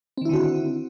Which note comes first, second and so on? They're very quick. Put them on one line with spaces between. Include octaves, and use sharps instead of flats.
C4 D#3 E4 D3 F#4